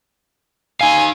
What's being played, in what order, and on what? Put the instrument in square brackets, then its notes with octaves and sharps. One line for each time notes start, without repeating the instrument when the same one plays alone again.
[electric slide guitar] D#4 F5 [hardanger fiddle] G#5